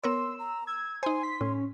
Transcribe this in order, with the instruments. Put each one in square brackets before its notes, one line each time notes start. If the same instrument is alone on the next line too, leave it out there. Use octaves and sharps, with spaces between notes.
[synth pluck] B3 A#4 C#5 [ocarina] C6 [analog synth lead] E6
[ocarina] A#5
[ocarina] E6 [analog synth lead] G#6
[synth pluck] D#4 C5 [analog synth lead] G#5 [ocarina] C6
[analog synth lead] B6
[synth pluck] A2 [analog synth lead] C#4